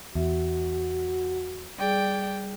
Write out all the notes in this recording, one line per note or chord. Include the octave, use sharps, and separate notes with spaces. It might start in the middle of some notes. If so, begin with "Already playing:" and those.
E2 F#4 E5
G3 G#4 D5 G5